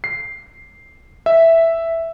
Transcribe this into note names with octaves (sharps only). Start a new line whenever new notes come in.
C7
E5